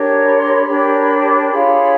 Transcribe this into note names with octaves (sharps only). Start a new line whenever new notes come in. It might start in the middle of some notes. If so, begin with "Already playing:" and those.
Already playing: D4 G4 A#4 C#5
B5
C6
B5
D4 G4 A#4 C#5
F4 G#4 C#5 B5